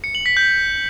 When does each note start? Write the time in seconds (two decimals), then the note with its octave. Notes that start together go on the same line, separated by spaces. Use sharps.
0.04 C#7
0.15 F#7
0.26 B6
0.37 G6